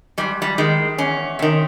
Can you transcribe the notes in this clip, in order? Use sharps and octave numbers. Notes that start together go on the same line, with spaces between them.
G#2 G3
G3
D#3 G#3
E2 C#4
C3 D#3